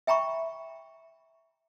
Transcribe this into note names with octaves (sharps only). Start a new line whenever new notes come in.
E5 G5 A#5 B5 C#6